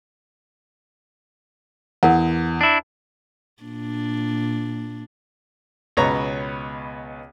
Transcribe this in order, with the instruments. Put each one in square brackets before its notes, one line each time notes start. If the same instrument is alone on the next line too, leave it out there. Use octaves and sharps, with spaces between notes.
[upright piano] E2 [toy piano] A#4 F#5
[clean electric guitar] D4 E4
[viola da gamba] A#2 D4
[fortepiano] C#2 B2 B3 C#5 A#5